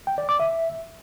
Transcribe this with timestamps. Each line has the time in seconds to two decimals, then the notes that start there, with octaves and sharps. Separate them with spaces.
0.07 G5
0.18 D5
0.29 D6
0.40 E5